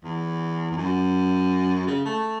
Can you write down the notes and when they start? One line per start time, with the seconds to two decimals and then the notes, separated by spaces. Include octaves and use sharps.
0.04 E2
0.72 E2
0.77 F#2
1.87 C#3
2.06 A3